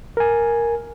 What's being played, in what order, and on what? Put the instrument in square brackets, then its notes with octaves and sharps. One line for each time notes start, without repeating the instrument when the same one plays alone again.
[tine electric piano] A#4 G#5